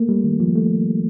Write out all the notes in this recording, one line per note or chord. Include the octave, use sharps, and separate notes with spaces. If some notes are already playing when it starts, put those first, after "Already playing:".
Already playing: A3 A#3
G3
D#3
F3
A3